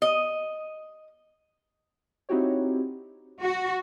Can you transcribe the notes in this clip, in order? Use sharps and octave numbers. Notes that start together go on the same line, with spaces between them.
D#5
C4 D#4 E4 F#4 G4 C#5
F#4